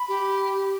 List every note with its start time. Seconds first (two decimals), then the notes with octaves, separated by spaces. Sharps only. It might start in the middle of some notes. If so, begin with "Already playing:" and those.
Already playing: B5
0.08 G4